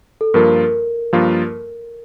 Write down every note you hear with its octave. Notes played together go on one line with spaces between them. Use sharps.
A4
G2 F3 A#3 F4 A#4
G2 F3 A#3 F4